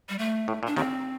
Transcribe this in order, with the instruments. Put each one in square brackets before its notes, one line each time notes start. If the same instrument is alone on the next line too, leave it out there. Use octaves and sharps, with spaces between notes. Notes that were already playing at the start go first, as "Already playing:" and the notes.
[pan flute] G3
A3
[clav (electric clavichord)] A2
A#2
[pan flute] D4
[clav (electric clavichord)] D#2 D#3 [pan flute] C4